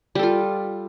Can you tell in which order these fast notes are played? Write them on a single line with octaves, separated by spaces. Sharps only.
G3 A4 F4